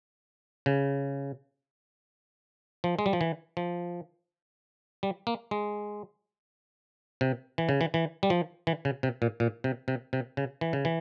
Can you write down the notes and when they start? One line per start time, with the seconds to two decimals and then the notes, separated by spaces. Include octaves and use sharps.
0.66 C#3
2.84 F3
2.99 G#3
3.06 G3
3.13 F3
3.21 E3
3.57 F3
5.03 G3
5.27 A#3
5.51 G#3
7.21 C3
7.58 E3
7.69 C#3
7.81 E3
7.94 E3
8.23 G3
8.30 F3
8.67 E3
8.85 C#3
9.03 C3
9.22 A#2
9.40 A#2
9.64 C3
9.88 C3
10.13 C3
10.37 C#3
10.61 E3
10.73 C#3
10.85 E3